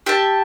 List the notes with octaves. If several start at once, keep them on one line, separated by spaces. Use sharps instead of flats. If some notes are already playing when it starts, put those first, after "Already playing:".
G4 E5 A5